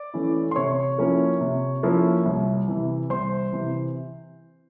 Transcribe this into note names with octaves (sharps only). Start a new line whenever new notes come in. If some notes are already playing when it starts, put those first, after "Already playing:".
Already playing: D5 D6
E3 A3 C#4 E4
C6
C3 C#5 C#6
F3 A#3 C#4 E4
C3
F3 A#3 C#4 E4
C2
C3 E3
C2 C5 C6
C3 E3